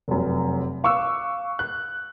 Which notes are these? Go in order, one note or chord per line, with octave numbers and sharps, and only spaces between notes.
F1 F#2
F5 C#6 D6 E6 F#6
F#6